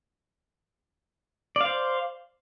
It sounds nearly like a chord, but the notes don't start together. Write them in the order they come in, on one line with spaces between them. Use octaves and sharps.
D5 F5 C5